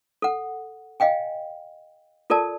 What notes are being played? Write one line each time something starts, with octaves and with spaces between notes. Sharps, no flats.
A4 F#5
D#5 F5 G5 G#5
F4 A4 A#4 D5 A5